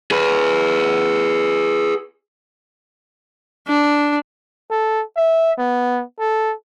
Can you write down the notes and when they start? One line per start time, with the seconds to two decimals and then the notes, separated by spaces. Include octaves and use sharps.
0.11 G#4 B4
3.68 D4
4.71 A4
5.17 E5
5.58 B3
6.20 A4